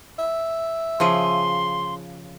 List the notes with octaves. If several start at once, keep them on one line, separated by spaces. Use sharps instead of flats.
E5
C#3 F3 G#4 C6